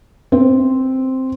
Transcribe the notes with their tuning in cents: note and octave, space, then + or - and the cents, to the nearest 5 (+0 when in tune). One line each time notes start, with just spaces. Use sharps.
C4 +0 C5 +0